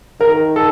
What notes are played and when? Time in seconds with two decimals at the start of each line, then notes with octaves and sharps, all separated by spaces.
0.21 D#3 A#4
0.56 A4